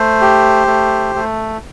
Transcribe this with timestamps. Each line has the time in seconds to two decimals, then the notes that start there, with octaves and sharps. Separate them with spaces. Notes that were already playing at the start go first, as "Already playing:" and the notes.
Already playing: A3 C5
0.21 G4
0.67 A3
1.15 A3